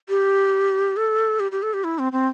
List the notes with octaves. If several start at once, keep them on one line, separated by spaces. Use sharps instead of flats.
G4
A4
G4
G4
A4
G4
E4
C4
C4